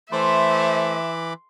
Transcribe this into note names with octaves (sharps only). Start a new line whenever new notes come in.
E3 A3 C5 E5 B5 C6 D6